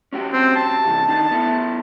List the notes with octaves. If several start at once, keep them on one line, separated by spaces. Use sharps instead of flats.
C#4 F#4 G4
C4
A5
C3 E3
D#3 D4 D#4
B3 E4 A4